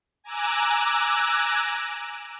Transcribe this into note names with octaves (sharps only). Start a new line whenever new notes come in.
G#5 A#5 D6 E6 F#6